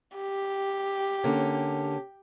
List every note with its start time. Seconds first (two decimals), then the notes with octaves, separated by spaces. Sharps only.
0.16 G4
1.24 D3 A#3 C#4